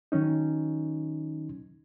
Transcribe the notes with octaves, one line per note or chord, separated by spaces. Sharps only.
D#3 F#3 C#4 D#4